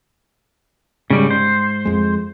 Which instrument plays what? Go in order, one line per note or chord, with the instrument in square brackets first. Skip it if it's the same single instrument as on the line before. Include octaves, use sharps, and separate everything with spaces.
[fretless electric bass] G#2 [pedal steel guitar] C#3 G3
[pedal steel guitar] C5
[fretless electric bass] F2 G#3